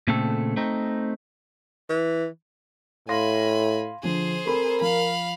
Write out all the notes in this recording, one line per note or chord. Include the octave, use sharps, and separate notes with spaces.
A#2 C#3 A3 C4 A4
A3 C4 D#4
E3
A2 F5 G#5 B5 C6 A#6
D3 F3 G#4 C5
C4 A4 A#4 B5
F3 F5 B5